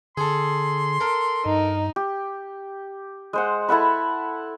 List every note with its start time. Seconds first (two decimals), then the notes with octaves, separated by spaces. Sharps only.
0.17 D3 G#4 A4 C6
1.00 A4 A#4
1.46 G2 D#4
1.96 G4
3.33 G#3 C5 F#5
3.69 E4 A4 F#5 B5